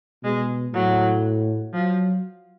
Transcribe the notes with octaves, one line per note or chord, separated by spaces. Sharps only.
B2 G#3
A2 F#3
F3 F#3